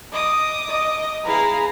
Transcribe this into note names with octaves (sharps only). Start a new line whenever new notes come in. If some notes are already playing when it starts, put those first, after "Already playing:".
D#5 D6 D#6
D#5
E4 G#4 B4 F5 A#5